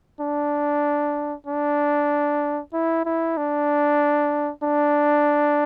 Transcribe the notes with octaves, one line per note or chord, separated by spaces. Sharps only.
D4
D4
E4
E4
D4
D4